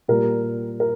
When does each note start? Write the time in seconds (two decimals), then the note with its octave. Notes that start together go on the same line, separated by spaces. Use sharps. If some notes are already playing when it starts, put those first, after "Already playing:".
0.08 A#2 G3 A#4
0.80 A#4